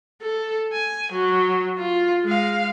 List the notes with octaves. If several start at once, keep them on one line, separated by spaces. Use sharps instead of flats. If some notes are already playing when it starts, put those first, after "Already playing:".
A4
G#5
F#3
F4
G#3 F5